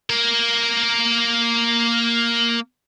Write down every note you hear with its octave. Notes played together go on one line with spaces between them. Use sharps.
A#3 A#4